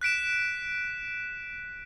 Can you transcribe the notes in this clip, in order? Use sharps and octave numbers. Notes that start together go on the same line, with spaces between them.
F#6 B6 D7 E7